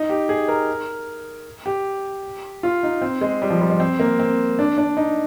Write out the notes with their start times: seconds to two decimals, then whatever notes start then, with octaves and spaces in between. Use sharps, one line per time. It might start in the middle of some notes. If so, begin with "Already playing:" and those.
Already playing: D#4
0.09 G4
0.29 G#4
0.48 A#4
1.66 G4
2.63 F4
2.83 D#4
3.02 C4
3.21 G#3
3.42 G3
3.50 F3
3.61 G3
3.70 G#3
3.80 C4
4.00 A#3
4.19 C4
4.59 D4
4.78 D4
4.97 D#4